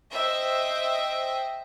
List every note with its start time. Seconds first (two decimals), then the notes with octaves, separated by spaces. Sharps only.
0.12 C5 D#5 E5 G5